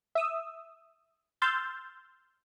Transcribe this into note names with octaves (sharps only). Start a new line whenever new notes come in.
E5 D#6 E6
C6 E6 F6 G6 A6